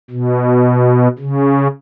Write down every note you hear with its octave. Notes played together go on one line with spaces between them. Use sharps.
B2
C#3